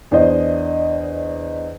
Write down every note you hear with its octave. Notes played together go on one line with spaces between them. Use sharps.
E2 D4 C5 D#5